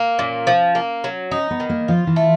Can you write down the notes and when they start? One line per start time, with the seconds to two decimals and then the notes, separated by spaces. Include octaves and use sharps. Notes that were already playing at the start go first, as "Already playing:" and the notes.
Already playing: A#3
0.19 A#2 C#4
0.47 F3
0.75 A#3
1.04 F#3
1.31 C#4 D#4
1.51 B3
1.60 D#3
1.69 A#3
1.88 F3 F4
2.07 E3
2.16 A3